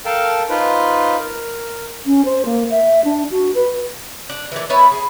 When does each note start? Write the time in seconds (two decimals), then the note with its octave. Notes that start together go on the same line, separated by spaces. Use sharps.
0.06 A4 A#4 F5 G5 A5
0.50 D#4 F4 B4 C5
1.19 A#4
2.06 C#4
2.25 C5
2.46 A#3
2.70 E5
3.05 D4
3.31 F#4
3.55 B4
4.30 D4
4.52 A#2 E3
4.70 B3 E4 B4 C#5
4.91 G#4